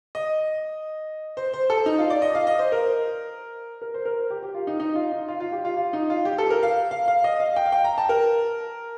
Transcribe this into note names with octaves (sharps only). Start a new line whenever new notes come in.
D#5
C5
C5
A4
D#4
F4
D5
D#5
F5
D#5
C5
A#4
A#4
C5
A#4
G4
G4
F4
D#4
D#4
F4
D#4
F4
F4
G4
F4
F4
D#4
F4
G4
A4
A#4
F5
F5
F5
D#5
F5
G5
F5
G5
A#5
A5
A#4